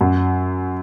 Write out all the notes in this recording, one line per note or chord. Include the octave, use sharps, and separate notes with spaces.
F#2